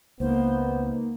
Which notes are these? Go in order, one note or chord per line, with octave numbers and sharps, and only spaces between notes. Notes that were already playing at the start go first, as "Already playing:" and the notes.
C#2 A#3 B3 D#4 C5